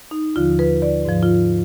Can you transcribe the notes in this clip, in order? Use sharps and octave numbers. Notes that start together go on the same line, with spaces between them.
D#4
D#2 D3 F3 F4
B4
D5
G#2 F3
F4